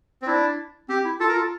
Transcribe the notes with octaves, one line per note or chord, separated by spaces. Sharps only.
C4
D4 E4
C4 G4
E4
F4 A4
A#4
F4 A4